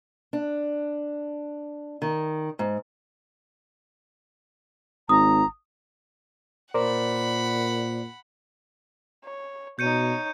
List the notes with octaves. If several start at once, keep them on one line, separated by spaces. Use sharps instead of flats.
D4
D#3
G#2
G#1 A#5 D#6
A#2 A#4 C5 D5 F#5 B5
C#5
B2 D#4 C#5 G6 C#7 D#7